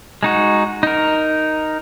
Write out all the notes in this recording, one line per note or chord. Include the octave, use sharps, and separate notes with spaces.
G#3 D#4 F#4
D#4 A#4